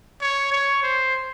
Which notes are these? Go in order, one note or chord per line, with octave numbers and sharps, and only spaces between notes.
C#5
C#5
C5